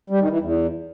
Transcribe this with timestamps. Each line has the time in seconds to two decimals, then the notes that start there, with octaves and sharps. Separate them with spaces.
0.10 G3
0.20 D#3
0.30 E3
0.40 E2